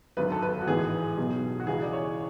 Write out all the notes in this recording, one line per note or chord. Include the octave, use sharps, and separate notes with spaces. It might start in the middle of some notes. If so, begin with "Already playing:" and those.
G#1 F#2 D3 B4
A4
B4
F#4
A1 G#2 E3 G#4
B1 B2
F#4
C#2 C#3 E3 G#4
D5
C#5